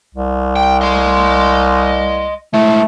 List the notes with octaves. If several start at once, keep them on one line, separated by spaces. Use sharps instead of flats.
C2
G5
D#5 C6
G#3 A3 E4